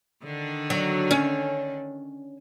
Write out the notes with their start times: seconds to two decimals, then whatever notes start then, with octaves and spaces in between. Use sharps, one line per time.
0.24 D3 D#3 D4
0.70 F#3
1.11 C#4